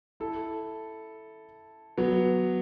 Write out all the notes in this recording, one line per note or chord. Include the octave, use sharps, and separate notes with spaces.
E4 A4
F#3 B3